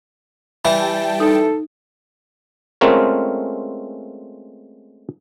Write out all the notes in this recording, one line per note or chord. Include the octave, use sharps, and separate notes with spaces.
E3 G3 E4 G5 A5
D#4 A4
G#3 A3 C4 C#4 F4 A#4